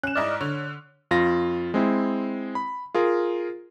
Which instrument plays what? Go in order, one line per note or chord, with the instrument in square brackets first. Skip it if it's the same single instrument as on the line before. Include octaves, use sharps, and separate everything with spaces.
[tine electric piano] C#4 [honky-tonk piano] F#6 E7
[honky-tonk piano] G#2 E4 F6 [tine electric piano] D5 D#5
[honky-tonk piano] D3 [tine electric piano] C#5
[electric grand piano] F2 F4 A#6
G#3 C4 E4
B5
F4 G#4 A#4